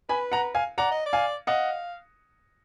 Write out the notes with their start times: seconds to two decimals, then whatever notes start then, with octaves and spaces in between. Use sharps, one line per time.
0.09 B4 G#5 B5
0.32 F#5 A#5
0.55 F5 G#5
0.78 D5 F#5 A#5
0.91 D#5
1.06 D5
1.13 F5 G#5
1.47 D#5 F5 F#5